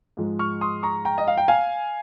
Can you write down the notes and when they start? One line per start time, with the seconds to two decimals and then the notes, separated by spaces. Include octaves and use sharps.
0.17 G#2 F3 G#3
0.39 C#6 F6
0.61 C6 D#6
0.83 A#5 C#6
1.05 G5 A#5
1.18 D#5
1.28 F5
1.37 G5
1.48 F5 G#5